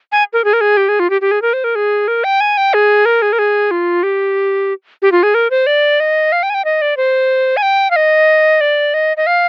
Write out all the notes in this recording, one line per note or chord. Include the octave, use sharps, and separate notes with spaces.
G#5
A#4
G#4
A#4
G#4
G4
G#4
F4
G4
G4
G#4
A#4
C5
A#4
G#4
A#4
G5
G#5
G5
G#4
A#4
G#4
A#4
G#4
F4
G4
G4
F4
G#4
A#4
C5
D5
D#5
F5
G5
G#5
G5
D#5
D5
C5
G#5
G5
F5
D#5
D5
D#5
D#5
F5